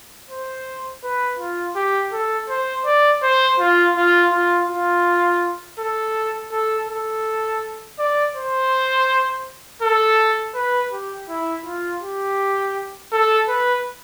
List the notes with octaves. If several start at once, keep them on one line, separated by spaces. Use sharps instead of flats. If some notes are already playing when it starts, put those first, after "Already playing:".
C5
B4
F4
G4
A4
C5
D5
C5
F4
F4
F4
F4
A4
A4
A4
D5
C5
A4
B4
G4
E4
F4
G4
A4
B4